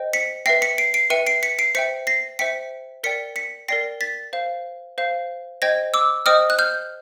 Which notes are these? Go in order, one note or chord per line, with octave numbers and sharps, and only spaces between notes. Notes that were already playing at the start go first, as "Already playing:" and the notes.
Already playing: C5 D#5 G5
B6 C#7
B4 E5 G5 A#6 C7
B6 C#7
C7 D7
C7 D7
B4 E5 G5 C#7 D#7
C7 D7
B6 C#7
C7 D7
C5 E5 G5 B6 C#7
A#6 C7
C5 E5 G5 B6 C#7
A#4 D5 G5 B6 C#7
B6 C#7
A#4 D5 G5 A#6 C7
A6 B6
C5 F5
C5 F5
C5 D#5 G5 G#6 A#6
D6 E6
C5 D#5 G5 D#6 F6
F#6
F6 G6